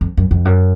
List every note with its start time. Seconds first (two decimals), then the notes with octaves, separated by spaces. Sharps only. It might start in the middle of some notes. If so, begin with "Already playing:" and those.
0.01 F2
0.17 F#2
0.31 F2
0.45 F#2